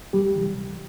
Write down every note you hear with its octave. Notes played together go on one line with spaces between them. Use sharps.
D2 G3 G4
C3 E3 G3
D2